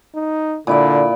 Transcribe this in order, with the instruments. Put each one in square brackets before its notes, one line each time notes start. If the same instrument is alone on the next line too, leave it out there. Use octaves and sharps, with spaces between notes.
[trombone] D#4
[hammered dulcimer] A#2 E4 D5 [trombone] D3